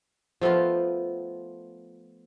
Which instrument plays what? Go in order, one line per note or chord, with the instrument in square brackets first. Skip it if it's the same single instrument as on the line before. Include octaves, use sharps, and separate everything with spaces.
[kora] F3 A3 B3 F4